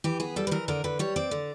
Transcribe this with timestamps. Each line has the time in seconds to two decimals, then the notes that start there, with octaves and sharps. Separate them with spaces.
0.04 E3 G4
0.20 B3 G#4
0.36 G3 A4
0.47 B4
0.51 E3 A#4
0.68 D3 A#4
0.84 D3 B4
0.99 G3 C#5
1.16 C4 D5
1.31 D3